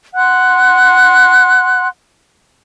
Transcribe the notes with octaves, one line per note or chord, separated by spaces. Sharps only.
F#5 C6 F#6